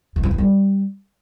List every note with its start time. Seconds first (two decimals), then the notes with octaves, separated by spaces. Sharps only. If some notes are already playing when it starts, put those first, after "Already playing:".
0.16 D#3
0.23 F3
0.31 E3
0.38 G3